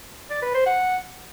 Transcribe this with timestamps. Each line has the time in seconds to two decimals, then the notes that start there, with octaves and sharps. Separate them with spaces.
0.30 D5
0.42 B4
0.54 C5
0.66 F#5